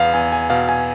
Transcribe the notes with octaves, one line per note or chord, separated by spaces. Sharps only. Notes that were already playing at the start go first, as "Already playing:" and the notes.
Already playing: E2 B3 F5
E2 G#5
G#5
B2 F5
G#5